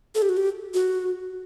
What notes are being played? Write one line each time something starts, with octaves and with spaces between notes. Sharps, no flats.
A4
G4
F#4
G4
F#4